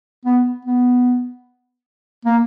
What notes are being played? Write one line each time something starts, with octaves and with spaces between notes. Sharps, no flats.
B3
B3
A#3